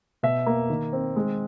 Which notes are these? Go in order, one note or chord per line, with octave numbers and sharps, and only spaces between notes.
B2 E5
A#3
D#3
C4
G#3